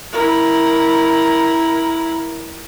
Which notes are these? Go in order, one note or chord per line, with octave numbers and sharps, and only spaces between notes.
E4 A#4